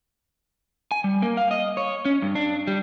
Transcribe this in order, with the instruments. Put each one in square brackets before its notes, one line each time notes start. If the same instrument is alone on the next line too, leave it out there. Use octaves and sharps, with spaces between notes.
[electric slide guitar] G#5
G3
A#3
F5
D#5
C#5
C#4
G2
D4
G3